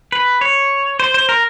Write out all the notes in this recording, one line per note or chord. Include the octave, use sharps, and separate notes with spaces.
B4
C#5
C5
C5
A#4